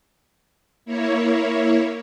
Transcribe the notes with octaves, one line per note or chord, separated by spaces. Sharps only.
A#3 E4 C#5